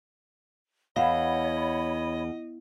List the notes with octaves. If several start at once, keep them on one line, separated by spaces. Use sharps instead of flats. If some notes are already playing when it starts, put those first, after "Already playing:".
E2 C#5 D#5 F5 F#5 B5